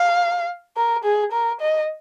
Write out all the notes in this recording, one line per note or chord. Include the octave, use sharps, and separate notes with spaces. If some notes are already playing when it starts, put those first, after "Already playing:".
Already playing: F5
A#4
G#4
A#4
D#5